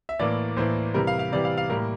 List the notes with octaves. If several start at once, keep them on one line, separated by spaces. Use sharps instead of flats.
E5
A2 E3 A#3 D5
A2 E3 A#3 C5
C3 E3 G3 A#4
F5
F5
C3 E3 G3 D5
F5
F5
A2 G3 A#3 A#4